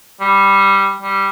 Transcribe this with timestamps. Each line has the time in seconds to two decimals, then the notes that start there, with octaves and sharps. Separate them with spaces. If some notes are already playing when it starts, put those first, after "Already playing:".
0.21 G3
1.02 G3